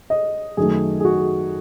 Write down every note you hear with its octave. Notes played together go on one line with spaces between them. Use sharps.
D#5
F#2 D#3 A3 G#4
G#4
F#4